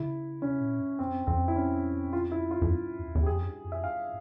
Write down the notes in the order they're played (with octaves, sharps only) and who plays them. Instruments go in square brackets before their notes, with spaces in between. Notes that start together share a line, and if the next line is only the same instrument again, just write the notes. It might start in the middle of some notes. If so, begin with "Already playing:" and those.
Already playing: [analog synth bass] C#3 [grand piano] E4
[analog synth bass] C3 [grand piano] C#4
[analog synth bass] A#2
G2
[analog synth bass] F2 [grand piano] C4
[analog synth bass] F2 [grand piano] C4
[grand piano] E4
C#4
F4
E4
F4
[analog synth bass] F2
G2
E2
E2
[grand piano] G4
[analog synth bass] F2 [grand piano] G#4
[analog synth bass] G2
F2
[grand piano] E5
[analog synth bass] G2 [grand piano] F5